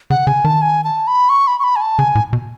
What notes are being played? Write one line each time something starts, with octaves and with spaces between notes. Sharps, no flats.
C#3 F#5
C#3 G#5
D#3 A5
G#5
A5
B5
C#6
B5
C#6
B5
G#5
A5
C#3 G#5
A2
B2